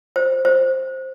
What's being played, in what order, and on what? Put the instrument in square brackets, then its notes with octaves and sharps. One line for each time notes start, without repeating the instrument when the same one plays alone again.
[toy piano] C5
C5